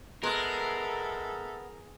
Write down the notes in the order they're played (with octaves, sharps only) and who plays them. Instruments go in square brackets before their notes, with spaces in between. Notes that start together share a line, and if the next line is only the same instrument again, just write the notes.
[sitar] G#3 [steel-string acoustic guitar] B3 [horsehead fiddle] A4 E5 [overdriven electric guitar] A#4